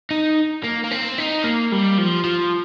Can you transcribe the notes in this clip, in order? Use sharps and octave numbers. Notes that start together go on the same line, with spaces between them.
D#4
A#3
A#3
C4
D#4
A#3
G3
F3
F3